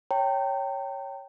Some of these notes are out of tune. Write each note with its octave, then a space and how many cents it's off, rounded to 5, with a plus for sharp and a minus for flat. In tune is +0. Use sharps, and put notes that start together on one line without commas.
C#5 +0 G5 -10 A#5 -45